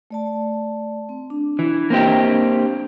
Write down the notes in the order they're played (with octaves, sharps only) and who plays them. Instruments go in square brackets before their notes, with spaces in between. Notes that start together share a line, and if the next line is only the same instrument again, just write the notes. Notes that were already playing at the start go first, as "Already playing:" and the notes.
[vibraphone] A3 D5 A5
C4
D4
[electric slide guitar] E3
A#3 C4 G4